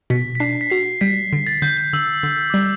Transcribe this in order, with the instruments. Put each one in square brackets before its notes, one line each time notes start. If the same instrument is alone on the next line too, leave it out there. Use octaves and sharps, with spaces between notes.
[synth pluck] B2 [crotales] B6
[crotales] B6
[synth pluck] D4 [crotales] C7
[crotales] B6
[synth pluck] F#4 [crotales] C7
[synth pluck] G3 [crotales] B6
[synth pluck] D3
[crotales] A6
[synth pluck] D3 [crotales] G6
[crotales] G6
[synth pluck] D3 [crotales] E6
[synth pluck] D3 [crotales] E6
[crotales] D6
[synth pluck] G3 [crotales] E6